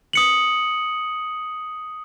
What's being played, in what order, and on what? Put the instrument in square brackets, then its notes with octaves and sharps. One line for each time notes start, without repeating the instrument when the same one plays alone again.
[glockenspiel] D#6 C#7 F#7